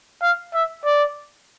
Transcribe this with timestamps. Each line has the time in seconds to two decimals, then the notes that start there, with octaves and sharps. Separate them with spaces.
0.22 F5
0.54 E5
0.85 D5